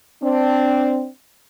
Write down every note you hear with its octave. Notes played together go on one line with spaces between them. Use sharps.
C4 D4